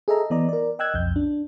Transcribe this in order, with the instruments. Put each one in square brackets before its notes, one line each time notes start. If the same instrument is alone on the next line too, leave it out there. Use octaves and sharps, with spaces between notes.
[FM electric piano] G#4 A4 D#5 E5 A#5
E3 B3 D5 D#5 A#5
A#4 D5
D#5 G5 E6 F#6 G#6
B1 F2 G6
D4